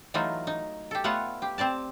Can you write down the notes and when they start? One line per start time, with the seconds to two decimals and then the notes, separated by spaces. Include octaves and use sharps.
0.14 E3 F#3 A3 D#4 F4
0.47 D#4
0.91 G4 A4
1.04 A3 B3 F4 C#5 F#5
1.42 G4
1.58 C4 C5 D5 A5